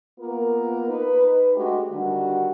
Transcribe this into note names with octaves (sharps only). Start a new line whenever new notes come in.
A#3 B3 F4 A#4
D#4 B4
G#3 A3 D4 F#4 G4
D3 D#3 G3 D4 F#4